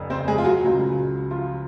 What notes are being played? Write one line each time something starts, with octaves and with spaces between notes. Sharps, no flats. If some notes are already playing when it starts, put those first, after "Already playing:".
Already playing: F1 F2 C#3
C4 C5
G#3 G#4
F4
F#3 F#4
C#2 C#3 F#3
F3 F4